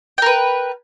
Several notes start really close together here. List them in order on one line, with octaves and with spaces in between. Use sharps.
G5 A#4 B4